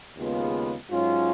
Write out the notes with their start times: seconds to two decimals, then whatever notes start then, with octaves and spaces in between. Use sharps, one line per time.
0.16 D#2 C#3 G#3 B3 F4
0.91 G#2 F#3 C#4 F4